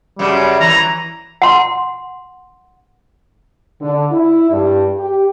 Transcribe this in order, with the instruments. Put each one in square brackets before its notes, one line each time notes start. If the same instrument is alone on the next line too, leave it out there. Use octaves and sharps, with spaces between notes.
[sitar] F#2 C#3 [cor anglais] G3
[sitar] E3 [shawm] A#5
[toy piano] F#5 C6
[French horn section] D3
E4
G2
G4